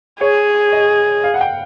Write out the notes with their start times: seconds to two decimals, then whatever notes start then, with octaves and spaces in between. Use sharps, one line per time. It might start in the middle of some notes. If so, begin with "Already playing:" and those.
0.21 G#4 C#5
0.72 D#5
1.24 F5
1.34 F#5
1.41 G5